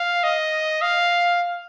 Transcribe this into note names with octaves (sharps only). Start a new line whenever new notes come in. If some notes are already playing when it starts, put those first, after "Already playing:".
Already playing: F5
D#5
F5